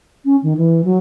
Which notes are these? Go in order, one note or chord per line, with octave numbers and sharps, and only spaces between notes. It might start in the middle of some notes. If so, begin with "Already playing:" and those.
C#4
D#3
E3
F#3